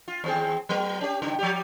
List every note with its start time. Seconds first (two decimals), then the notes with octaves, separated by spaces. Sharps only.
0.08 F4
0.24 D#2 C4 G#4
0.69 F#3 B3 A#4
1.01 C#4 G4
1.22 G2 C#3 D#4
1.39 F3 G3 G4